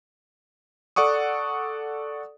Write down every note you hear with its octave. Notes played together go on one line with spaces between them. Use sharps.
A4 D5 F#5 C#6 D#6